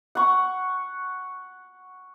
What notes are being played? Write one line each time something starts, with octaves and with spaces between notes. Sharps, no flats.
F#5 C#6